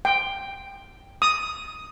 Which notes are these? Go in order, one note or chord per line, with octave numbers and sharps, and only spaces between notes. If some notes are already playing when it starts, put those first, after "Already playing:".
G5
D#6